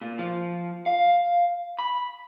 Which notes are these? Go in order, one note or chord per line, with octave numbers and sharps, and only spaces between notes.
A#2
F3
F5
B5